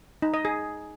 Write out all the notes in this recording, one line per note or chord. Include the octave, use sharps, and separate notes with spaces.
D#4
D#5
G#4